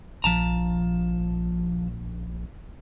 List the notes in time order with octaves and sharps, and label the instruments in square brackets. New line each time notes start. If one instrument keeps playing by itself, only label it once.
[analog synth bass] A#1 [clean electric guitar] F3 A5 A#5